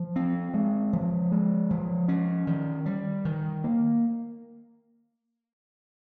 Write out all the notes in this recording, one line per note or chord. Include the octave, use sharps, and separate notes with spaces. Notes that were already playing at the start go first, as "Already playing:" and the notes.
Already playing: F3
C4
G#3
F3
G#3
F3
C#4
D#3
G3
D#3
A#3